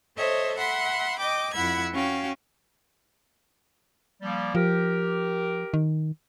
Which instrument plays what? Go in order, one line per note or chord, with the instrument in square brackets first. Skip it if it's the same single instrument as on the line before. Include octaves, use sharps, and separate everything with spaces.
[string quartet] A4 C5 C#5 D#5 E5
E5 F#5 B5 C6
D#5 G5 D6
F2 E4 F#5 B5 E6 G#6
C#4 F#4 F5 G5
[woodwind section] F3 G3 A#3
[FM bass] F3 [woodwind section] G4 A#4
[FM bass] D#3